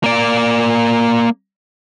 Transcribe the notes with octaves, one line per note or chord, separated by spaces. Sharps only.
A#3 D5